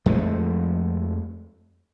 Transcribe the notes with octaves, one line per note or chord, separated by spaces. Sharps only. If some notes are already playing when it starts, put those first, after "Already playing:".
F2 F3 G#3 A3